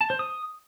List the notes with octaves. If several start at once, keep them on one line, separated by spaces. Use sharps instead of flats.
A5
C5
D#6